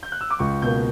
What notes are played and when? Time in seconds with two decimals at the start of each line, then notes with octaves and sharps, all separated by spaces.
0.03 G6
0.12 F#6
0.21 E6
0.30 D6
0.39 C#2 C#6
0.62 B2 A#3 G6